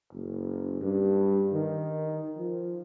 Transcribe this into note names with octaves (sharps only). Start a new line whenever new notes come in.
F#1
G2
D#3
F3